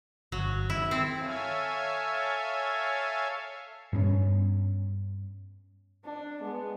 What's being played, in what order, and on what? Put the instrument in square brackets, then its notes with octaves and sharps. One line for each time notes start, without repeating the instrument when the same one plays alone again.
[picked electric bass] G1 [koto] F#3
[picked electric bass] D#3 [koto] E4
[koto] C4
[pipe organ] A4 C#5 E5 F5 G#5
[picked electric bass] G2 B3 C#4
[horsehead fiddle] D4
[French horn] G#3 [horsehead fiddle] B3